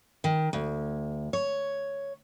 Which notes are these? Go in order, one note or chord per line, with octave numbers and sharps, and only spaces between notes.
D#3
D2
C#5